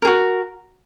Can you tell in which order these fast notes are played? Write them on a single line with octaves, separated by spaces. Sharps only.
A#4 G#4 F#4